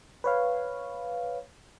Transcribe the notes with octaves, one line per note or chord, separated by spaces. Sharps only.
B4 C#5 F5